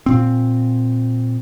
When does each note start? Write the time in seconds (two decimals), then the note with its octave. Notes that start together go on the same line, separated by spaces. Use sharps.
0.06 A#2 C4